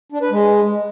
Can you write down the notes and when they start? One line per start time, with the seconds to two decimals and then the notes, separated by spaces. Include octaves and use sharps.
0.12 D4
0.22 B4
0.31 G#3